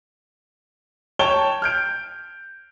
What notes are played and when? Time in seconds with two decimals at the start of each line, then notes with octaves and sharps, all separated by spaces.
1.19 C#5 G5 A5 G#6 G7
1.62 F6 G6 D7